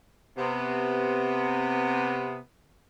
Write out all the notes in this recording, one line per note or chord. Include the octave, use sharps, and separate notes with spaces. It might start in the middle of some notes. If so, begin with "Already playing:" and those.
C3 B3